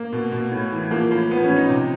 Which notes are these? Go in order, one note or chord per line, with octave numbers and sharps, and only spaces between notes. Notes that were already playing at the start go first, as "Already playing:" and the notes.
Already playing: A#3
B2
B2
A2
E3
F3 A#3
A2 A#3
F3 B3
C#4
F3
D#4
C3